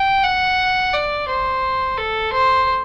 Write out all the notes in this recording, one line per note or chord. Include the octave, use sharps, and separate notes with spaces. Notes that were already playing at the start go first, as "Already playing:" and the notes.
Already playing: G5
F#5
D5
C5
A4
C5